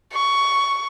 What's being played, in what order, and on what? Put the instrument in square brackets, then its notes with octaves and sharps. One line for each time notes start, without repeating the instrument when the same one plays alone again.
[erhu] C#6